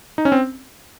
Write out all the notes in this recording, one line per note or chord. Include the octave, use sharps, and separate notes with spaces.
D#4
C#4
C4